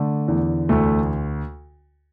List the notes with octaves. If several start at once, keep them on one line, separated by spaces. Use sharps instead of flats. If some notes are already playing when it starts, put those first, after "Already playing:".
Already playing: D3 A3
E2
D2 A3